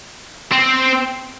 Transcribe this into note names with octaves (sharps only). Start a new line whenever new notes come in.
C4